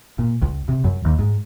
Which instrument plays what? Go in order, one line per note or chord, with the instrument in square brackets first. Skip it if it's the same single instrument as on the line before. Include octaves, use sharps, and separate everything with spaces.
[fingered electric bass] A#2
C#2
C3
F#2
D#2
G#2